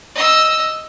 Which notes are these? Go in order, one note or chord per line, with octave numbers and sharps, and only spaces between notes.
D#5 E6